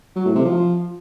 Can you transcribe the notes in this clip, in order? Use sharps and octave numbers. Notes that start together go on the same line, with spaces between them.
F#3
A2
C3
F3